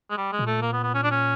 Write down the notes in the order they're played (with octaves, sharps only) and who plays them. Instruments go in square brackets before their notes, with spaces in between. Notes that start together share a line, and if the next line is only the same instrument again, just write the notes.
[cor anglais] G#3
G3
G#3
[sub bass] A#2
[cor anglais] A3
A#3
B3
B3
C#4
D4
C#4